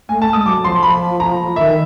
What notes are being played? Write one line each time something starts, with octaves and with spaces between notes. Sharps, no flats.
A3 G#5
A5
G#3 D#6
F#3 D6
F3 C6
B5
A#5
D#3 E5